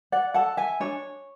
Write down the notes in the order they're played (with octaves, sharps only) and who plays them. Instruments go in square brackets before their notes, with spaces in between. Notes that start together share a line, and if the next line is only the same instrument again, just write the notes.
[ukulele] D5 F#5
A4 F#5 A5
E5 G#5
D4 C#5